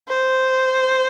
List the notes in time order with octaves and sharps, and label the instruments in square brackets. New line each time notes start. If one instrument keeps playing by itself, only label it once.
[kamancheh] C5